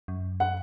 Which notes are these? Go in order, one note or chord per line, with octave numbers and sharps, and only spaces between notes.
F#2
F#5